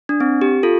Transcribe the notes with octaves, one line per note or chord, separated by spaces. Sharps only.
D4
C4
G4
F4 A4